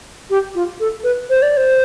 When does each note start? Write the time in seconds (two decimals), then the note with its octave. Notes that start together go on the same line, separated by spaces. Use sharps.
0.30 G4
0.55 F4
0.80 A4
1.04 B4
1.30 C5
1.42 D5
1.57 C5